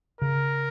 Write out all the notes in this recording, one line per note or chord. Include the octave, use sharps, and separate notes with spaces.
C#3 A#4